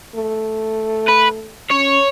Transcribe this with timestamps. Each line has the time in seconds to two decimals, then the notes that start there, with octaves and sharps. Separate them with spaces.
0.15 A3
1.08 B4
1.70 C#4 C#5